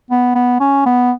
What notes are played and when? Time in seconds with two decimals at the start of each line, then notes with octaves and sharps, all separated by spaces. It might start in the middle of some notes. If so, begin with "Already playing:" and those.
0.10 B3
0.35 B3
0.60 C#4
0.86 B3